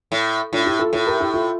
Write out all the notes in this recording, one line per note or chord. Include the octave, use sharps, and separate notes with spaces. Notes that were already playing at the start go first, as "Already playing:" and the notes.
A2
A2 D4 F4
E4 G4
F4 A4
A2 F4 A4
G4 A#4
E4 G4
F4 A4